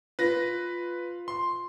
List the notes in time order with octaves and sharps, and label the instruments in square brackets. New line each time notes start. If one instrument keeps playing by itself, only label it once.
[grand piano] F4 [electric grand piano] B4 A#6
[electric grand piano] C6